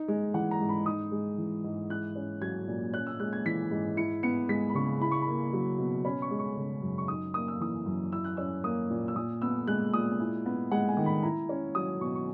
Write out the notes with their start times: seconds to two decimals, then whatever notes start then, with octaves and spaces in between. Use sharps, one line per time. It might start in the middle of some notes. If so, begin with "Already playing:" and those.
Already playing: D#4
0.08 G#3
0.34 E3 F#5
0.51 A#5
0.60 G#2
0.69 B5
0.86 D#4 D#6
1.12 G#3
1.38 E3
1.64 G#2
1.90 E4 F#6
2.16 C#4
2.42 F#3 G#6
2.68 A#2
2.93 C#4 F#6
3.07 E6
3.20 G#3 F#6
3.33 G#6
3.46 E3 B6
3.71 G#2
3.97 E4 C#7
4.23 B3 C#7
4.49 G#3 B6
4.69 B5
4.75 C#3 C#6
5.01 E4 B5
5.11 C#6
5.22 B5
5.27 A#3
5.53 F#3
5.79 B2
6.05 C#4 B5
6.22 C#6
6.31 G#3
6.39 C#6
6.57 C#3
6.82 F#2
6.98 C#6
7.08 D#4 D#6
7.34 A#3 D#6
7.48 E6
7.60 E3 D#6
7.86 F#2
8.12 E4 E6
8.24 F#6
8.37 C#4 E6
8.64 A#3 D#6
8.90 A#2
9.08 E6
9.16 A#2 D#6
9.42 B3 E6
9.67 G#3 F#6
9.94 A#2 D#6
10.20 E4
10.46 B3
10.71 G#3 F#5
10.89 G#5
10.97 D#3
11.06 B5
11.23 E4 A#5
11.49 C#4
11.75 F#3 D#6
12.01 B2 C#6
12.15 C#6